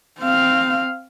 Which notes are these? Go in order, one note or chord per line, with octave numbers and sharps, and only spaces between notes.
C4 F5